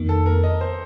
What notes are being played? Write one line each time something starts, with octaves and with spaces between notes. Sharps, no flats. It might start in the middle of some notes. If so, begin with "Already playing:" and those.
Already playing: F2 D#3 A#3
A4
A#4
D#5
C5